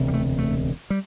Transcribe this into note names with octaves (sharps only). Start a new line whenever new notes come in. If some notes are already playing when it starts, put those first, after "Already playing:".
Already playing: E1 D2 C3
G3
A3
A3
G3